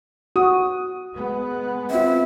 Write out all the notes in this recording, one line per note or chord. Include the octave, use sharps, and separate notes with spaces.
F#4 D#6
G#3 B3
C4 F4 E5